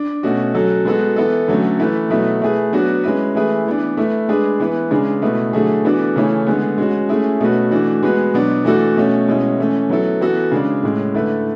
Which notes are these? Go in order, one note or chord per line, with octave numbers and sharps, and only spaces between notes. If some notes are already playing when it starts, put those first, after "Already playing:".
Already playing: D4
B2 A3 C#4 F#4
F#3 C#4 F#4 A4
G#3 B3 F#4 A4
E3 B3 E4 A4
D3 F#3 A3 C#4
E3 A3 E4 B4
B2 F#3 A3 E4 B4
A3 E4 G#4 B4
F#3 B3 D4 F#4
G#3 C#4 E4 B4
E3 A3 E4 G#4 B4
E3 B3 D4
A3 E4 B4
G#3 D4 G#4 B4
E3 B3 E4 B4
C#3 G#3 D4
B2 A3 E4 B4
D3 F#3 A3 E4 G#4
E3 B3 D4 F#4 A4
C#3 E3 A3 C#4 E4
D3 G#3 B3
G#3 C#4 F#4
A3 C#4 E4 G#4
B2 A3 C#4 F#4 B4
E3 A3 D4 F#4
G#3 B3 F#4 B4
B2 F#3 B3 D4
E3 A3 D4 F#4 A4
B2 A3 C#4
B2 G#3 C#4 E4
E3 A3 C#4
F#3 B3 E4 A4
E3 B3 F#4 A4
C#3 G#3 D4
A2 G#3 C#4
D3 A3 E4 B4